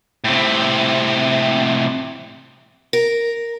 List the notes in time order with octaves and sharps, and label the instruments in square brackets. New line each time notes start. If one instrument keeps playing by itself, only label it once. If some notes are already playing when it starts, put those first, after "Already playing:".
[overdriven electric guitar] A2 C3
[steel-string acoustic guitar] A#4